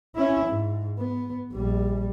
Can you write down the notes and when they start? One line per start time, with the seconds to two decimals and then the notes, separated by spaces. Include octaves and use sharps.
0.16 C#4 E4
0.47 G#2
0.98 B3
1.53 A#1 G3